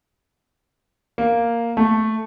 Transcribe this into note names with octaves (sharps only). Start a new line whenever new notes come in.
A#3
A3